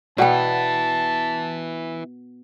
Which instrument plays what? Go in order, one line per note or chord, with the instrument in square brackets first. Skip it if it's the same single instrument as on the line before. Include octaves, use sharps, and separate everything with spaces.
[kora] B2 B3 [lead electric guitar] E4 B4 [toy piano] D5 F#5 G5 [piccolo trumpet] A5